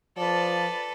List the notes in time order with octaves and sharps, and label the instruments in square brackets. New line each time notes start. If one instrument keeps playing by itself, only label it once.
[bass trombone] F3 [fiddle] A4 B4 [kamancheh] D5